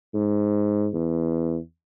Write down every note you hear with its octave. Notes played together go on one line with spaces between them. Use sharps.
G#2
E2